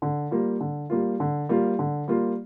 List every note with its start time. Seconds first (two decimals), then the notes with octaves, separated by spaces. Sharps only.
0.02 D3
0.31 G3 A#3 F4
0.60 D3
0.90 G3 A#3 F4
1.20 D3
1.49 G3 A#3 F4
1.79 D3
2.08 G3 A#3 F4